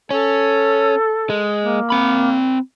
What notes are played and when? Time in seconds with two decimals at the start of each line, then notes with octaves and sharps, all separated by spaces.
0.11 C#4 A4
1.30 G#3
1.62 A#3
1.90 C4 B5